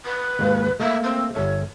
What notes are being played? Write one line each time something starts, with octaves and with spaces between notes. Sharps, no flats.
B4
D#2 G#2 A#3
A3 A#3 E5
C4
G1 A4 C#5 E5